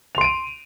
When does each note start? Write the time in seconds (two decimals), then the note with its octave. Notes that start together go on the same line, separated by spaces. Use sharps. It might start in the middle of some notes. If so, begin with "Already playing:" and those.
0.15 F7
0.18 C6
0.21 D7
0.24 D#7